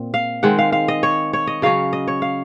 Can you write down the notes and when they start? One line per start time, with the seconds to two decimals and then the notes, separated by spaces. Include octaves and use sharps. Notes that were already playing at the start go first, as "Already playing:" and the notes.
Already playing: A#2 C4
0.14 F5
0.43 D#3 G#3 C4 F#5
0.59 F5
0.72 F5
0.88 D#5
1.03 C#5
1.33 C#5
1.47 D#5
1.62 C#3 F#3 C#4 F5
1.93 D#5
2.08 C#5
2.22 F5